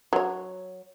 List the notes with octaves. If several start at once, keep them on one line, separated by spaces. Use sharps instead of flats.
F#3 C#5